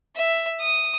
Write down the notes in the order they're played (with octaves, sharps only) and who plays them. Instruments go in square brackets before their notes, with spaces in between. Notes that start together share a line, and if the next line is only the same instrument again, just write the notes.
[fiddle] E5
D#6